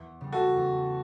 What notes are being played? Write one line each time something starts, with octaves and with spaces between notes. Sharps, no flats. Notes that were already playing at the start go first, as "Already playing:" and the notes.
Already playing: E2
C#3 G3
F#4 A4
E2